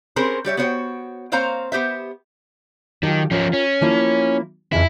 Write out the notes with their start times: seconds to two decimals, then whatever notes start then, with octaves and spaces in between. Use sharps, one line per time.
0.16 C4 C#4 G#4 A#4 C5
0.45 G3 G4 C#5 E5
0.57 B3 F#4 C5 C#5 F5 G5
1.32 A#3 C4 C5 C#5 F5 A#5
1.72 B3 G4 C5 E5
3.03 D#3 F3 F#3 G4
3.31 F3 C#4 F4 A#4
3.53 C#4
3.81 F3 A#3 E4
4.73 F2 C#3 E3 E4